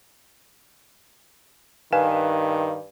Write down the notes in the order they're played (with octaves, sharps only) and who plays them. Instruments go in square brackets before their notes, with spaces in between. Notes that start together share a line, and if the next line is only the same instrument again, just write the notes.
[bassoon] G2 [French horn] D#3 [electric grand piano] B4 G#5 E7 [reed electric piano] F5